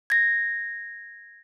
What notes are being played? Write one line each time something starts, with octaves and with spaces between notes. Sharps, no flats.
G#6 A#6